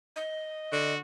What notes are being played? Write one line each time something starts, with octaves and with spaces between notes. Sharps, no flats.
D#5
D3 F#4